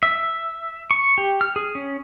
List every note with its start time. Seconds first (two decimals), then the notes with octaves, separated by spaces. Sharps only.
0.03 E5
0.91 C#6
1.18 G4
1.41 F6
1.56 G#4
1.75 C#4